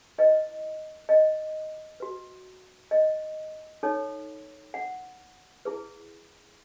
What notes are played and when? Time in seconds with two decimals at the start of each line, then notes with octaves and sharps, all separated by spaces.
0.18 E4 B4 D#5
1.09 D#5
2.00 F#4 B4
2.91 D#5
3.83 D#4 A4 C#5
4.74 F#5
5.65 E4 G#4 B4